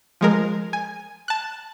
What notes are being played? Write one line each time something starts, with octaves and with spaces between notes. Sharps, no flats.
F3 G#3 A#4
G#5
A5 F#6